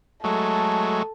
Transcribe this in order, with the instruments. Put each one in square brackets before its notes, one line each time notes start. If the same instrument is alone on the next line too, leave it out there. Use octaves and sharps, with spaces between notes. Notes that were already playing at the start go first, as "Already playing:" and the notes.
[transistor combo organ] F#3 G#3 A3 [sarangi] A4